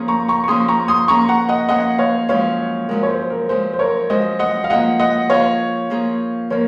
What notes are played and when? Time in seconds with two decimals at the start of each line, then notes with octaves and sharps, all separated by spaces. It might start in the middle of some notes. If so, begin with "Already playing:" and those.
Already playing: F3 A#3 C#4 G#4
0.08 A#5 C#6
0.28 A#5 C#6
0.44 C#6
0.48 F3 A#3 C#4 G#4 C6 D#6
0.68 A#5 C#6
0.88 C6 D#6
1.08 F3 A#3 C#4 G#4 A#5 C#6
1.29 F#5 A#5
1.49 D#5 F#5
1.69 F3 A#3 C#4 G#4 D#5 F#5
1.98 C#5 F5
2.29 F#2 F3 G#3 C#5 F5
2.89 F#2 F3 G#3 A#4
3.03 C#5
3.09 C5
3.20 C5
3.30 A#4
3.49 F#2 F3 G#3 C5
3.73 C5
3.79 A#4 C#5
4.10 F#2 F3 G#3 C5 D#5
4.39 D#5 F#5
4.64 F5
4.70 F3 A#3 F4 G#4 D#5 F#5
5.00 D#5 F#5
5.30 F3 A#3 F4 G#4 C#5 F5
5.90 F3 A#3 F4 G#4
6.50 F3 A#3 A#4 C#5